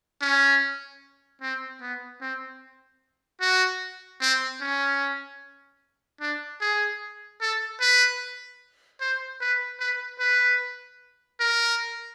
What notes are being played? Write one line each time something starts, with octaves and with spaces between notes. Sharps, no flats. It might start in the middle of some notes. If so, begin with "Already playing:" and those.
C#4
C4
B3
C4
F#4
C4
C#4
D4
G#4
A4
B4
C5
B4
B4
B4
A#4